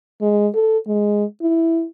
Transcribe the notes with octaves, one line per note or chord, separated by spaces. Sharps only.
G#3
A4
G#3
E4